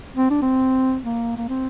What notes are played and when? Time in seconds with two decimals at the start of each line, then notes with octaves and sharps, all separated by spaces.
0.17 C4
0.30 D4
0.42 C4
1.04 A#3
1.37 A#3
1.49 C4